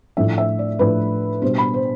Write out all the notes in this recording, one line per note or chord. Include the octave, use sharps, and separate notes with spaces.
A2 F3 A3 D4 E5
E5
D5
A2 F3 A3 D4 B4
B2 G3 D4 C5
B5
C5